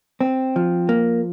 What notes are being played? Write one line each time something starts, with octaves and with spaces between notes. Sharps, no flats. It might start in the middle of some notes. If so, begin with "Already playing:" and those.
C4
F3
A#3